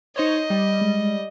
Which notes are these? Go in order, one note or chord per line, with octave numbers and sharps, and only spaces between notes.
D#4 C5 C#5 D#5
G3
G#3